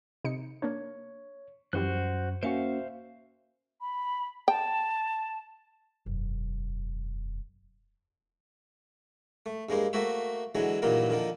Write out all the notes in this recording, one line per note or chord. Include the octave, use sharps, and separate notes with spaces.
C3 D#4 C#7
A#3 D4 C#5
F#2 E3 F3 G3 F#4 C5 F#6
A#3 C#4 F#4 C5 E5 F5 C#7
B5
G5 A5
E1 F#2
A3
G2 G#3 A#3 C5
A3 A#3 F#4 C5 E5
D3 E3 F#3 G#3
G2 A#2 D#3 E3 F#3 A#3
D3 D#3 F3 A#3